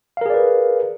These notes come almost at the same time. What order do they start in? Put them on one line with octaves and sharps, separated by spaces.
F5 A#4 G#4 D5 B4